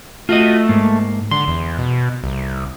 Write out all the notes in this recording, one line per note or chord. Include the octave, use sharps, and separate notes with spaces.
A3 F4 F#4 D#5
G#2 A#3
D3 C6
E2
B2
C2